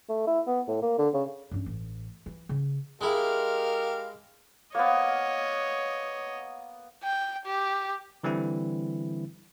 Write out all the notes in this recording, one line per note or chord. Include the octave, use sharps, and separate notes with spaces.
A3
E4
B3
A2
A#3
D3
C#3
G2 C#4
A1
E3
C#3
G#3 E4 G4 A#4 F5
A#3 B3 C#5 D#5
G5
G4
D3 E3 G3 C4 E4